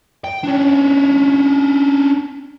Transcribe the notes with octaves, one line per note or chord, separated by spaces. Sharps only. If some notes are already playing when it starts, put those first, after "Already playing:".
G5
C#4 D4